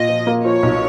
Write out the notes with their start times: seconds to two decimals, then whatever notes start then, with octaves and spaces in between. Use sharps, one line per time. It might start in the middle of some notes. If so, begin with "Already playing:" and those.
Already playing: A#2 D#5
0.09 F3
0.27 A#3
0.44 F3 C#5
0.63 B1